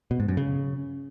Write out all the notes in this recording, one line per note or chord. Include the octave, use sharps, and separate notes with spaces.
B2
G#2
F#2
C#3